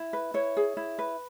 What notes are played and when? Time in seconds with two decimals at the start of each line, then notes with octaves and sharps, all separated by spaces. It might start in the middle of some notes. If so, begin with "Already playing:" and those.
Already playing: E4
0.13 B4
0.34 E4 C#5
0.57 G#4
0.77 E4
0.99 B4